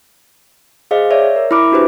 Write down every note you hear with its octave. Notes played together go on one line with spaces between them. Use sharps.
G#4 C5 D#5 F5
C#5 D5 E5
A#4
E4 E5 B5 D6 F#6 D7
D4 F#4 G4 B4 C5